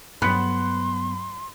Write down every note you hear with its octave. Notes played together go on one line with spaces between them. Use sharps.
G2 F#3 B3 B5 C6 F#6 C#7